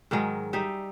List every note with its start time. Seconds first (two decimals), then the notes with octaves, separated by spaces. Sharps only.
0.11 G#2 D#3 F#3 G#3
0.53 G3 D#4 E5